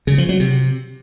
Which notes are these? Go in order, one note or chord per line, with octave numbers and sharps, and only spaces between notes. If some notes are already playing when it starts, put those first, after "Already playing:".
C#3
F3
F#3
C3